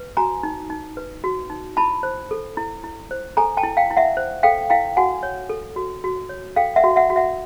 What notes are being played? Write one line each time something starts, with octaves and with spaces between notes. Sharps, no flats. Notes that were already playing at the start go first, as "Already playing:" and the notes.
Already playing: B4
F#4 G#5 A#5
D#4
D#4
B4
F#4
D#4
E4 A5 B5
C5
A4
E4
E4
C5
A4 G#5 A#5
G5 A5
E4
F5 G5
E4
E5 F#5
C5
A4 F5 G5
E4 F5 G5
F#4 F#5 G#5
C#5
A4
F#4
F#4
C#5
A4 F5 G5
E5 F#5
F#4
E5 F#5
F#4
E5 F#5